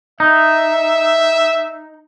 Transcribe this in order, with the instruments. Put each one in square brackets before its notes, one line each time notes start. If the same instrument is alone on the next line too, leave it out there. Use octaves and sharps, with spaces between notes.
[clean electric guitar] D#4 [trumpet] E5